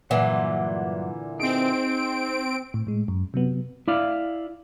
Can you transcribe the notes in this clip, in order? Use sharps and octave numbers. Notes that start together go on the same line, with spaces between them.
G2 A#2 D3 E3 F#3 F#5
C4 D#4 G#4 D7
A2
A2 G#3
F#2
C3 F#3 B3
E4 D5 F5